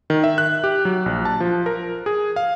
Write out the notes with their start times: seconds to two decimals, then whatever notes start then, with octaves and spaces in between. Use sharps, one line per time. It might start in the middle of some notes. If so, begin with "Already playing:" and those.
0.10 D#3
0.24 E5
0.38 F#6
0.64 G4
0.85 F#3
1.06 A#1
1.25 A5
1.40 F3
1.66 A#4
2.06 G#4
2.36 F5